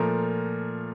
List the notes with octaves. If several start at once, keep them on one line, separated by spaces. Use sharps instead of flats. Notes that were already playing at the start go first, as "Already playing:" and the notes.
Already playing: A#2 F3 A3 A#4